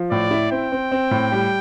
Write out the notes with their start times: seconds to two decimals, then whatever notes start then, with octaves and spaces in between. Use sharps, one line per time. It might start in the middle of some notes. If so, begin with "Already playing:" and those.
Already playing: F3
0.11 A2 D5
0.31 E4
0.51 C4 G5
0.72 C4
0.92 C4
1.11 A2
1.32 G3